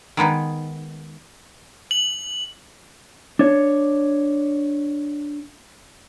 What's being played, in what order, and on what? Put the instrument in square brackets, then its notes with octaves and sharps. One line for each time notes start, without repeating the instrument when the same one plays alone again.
[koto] D#3 G#3 B3 D#4
[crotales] F#7
[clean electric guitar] D4 C#5